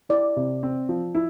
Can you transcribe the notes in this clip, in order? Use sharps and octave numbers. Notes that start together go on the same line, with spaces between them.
E4 D5
C3
C4
F3
E4